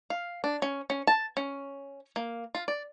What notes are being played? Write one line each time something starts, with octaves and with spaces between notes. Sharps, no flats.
F5
D4
C#4
C#4
A5
C#4
A#3
F4
D5